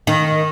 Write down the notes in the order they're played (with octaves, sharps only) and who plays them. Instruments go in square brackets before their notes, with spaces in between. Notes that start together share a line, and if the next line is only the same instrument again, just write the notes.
[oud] D#3